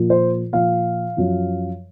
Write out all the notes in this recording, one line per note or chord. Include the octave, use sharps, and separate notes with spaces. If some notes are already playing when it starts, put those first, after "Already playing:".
Already playing: A#2 F3
C5
A#2 F3 F5
F#2 F3